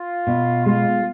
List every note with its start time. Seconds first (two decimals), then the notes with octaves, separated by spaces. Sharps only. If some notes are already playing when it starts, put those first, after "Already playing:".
Already playing: F4
0.27 B2
0.66 G#3 F4